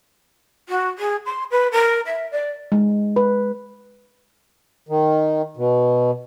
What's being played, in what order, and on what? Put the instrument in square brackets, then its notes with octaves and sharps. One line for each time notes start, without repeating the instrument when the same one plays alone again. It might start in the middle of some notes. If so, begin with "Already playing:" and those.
[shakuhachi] F#4
G#4
C6
B4
A#4
E5
D5
[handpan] G#3
B4
[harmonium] D#3
B2